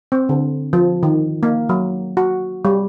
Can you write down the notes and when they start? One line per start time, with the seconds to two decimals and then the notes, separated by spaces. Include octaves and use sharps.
0.12 C4
0.29 D3
0.73 F3
1.03 D#3
1.43 A#3
1.69 F#3
2.17 F#4
2.65 G3